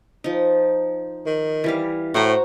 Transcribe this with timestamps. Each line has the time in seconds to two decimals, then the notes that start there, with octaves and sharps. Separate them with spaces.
0.24 F3 D#4
1.26 D#3
1.64 E3 G3 F5
2.14 A2 F#4 C5 A#5